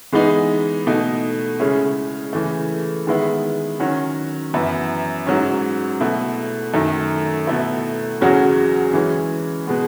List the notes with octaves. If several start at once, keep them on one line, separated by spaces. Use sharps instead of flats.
E3 G#3 B3 D#4
B2 A3 D#4
C#3 G#3 C#4 E4
C#3 E3 A3
D#3 G#3 B3 E4
D#3 F#3 C#4 F#4
F#2 E3 B3 E4
G#2 F#3 C#4
B2 A3 E4
F#2 D#3 A3
B2 A3 E4
E2 C#3 F#3 C#4 F#4
E3 G#3 C#4
B2 G#3 B3